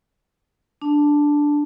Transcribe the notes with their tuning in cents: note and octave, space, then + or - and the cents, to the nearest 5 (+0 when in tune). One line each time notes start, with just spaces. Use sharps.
D4 +0 A5 +0